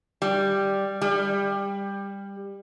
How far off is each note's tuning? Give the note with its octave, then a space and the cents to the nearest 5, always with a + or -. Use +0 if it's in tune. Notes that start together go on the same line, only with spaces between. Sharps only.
G3 +0
G3 +20